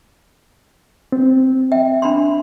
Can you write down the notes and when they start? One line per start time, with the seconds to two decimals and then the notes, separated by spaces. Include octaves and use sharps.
1.12 C4
1.72 E5 G5
2.02 D4 B5 C6